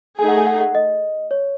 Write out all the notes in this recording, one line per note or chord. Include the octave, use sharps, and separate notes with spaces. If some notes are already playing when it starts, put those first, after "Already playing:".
A3 D#4 G#4 G#5
F#5
G#5
F#5
F#5
D#5
C#5